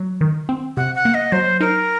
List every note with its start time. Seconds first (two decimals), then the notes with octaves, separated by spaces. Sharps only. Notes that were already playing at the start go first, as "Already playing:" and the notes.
Already playing: F#3
0.21 D#3
0.49 C4
0.77 C3 F#5
0.95 F#5
1.05 A#3
1.14 D#5
1.32 F#3 C5
1.60 D#4 A#4